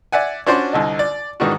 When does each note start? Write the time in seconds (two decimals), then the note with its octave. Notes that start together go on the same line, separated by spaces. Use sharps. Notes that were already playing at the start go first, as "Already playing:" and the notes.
0.12 D5 E5 F#5 G#5
0.46 C#4 D4 F#4 C5 D5 C6
0.73 C2 D3 D#4
0.99 D5
1.40 G#2 D#3 E3 G#3 D4 F#4